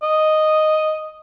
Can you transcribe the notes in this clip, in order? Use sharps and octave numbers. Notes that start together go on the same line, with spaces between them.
D#5